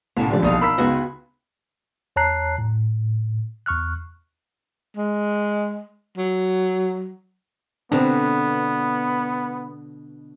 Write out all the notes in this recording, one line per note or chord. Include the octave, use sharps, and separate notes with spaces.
C2 A2 C#4 A5 A#5
D3 E3 F3 G3 D5
A#1 B2 D#4 F5 D#6
A#4 B5 E6 B6
C#2 B3 D#4 F#4 G#4
E2 C#5 A5 A#5 F#6 C7
A2
E2 C#6 F6 F#6
G#3
F#3
B2 D3 B3 C4 D4